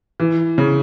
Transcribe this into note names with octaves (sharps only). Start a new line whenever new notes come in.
E3
C#3